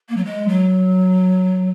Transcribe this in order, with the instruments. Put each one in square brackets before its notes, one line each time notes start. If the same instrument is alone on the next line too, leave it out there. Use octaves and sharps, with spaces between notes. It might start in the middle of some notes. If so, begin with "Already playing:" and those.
[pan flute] A#3
F#3
G#3
F#3